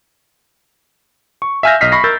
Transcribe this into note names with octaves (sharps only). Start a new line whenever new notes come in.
C#6
E5 F5 G#5 F6 G6 A#6
B1 D#5 F6 B6 C7
B5 C#6 A#6 C7
A#4 E6 G6 A6